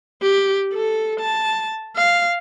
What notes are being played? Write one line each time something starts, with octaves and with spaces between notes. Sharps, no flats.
G4
A4
A5
F5